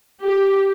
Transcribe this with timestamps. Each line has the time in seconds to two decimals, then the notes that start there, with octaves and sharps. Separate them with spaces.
0.22 G4